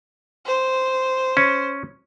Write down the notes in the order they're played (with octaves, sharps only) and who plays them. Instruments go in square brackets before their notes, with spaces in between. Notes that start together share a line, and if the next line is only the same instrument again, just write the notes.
[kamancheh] C5
[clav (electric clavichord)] C#4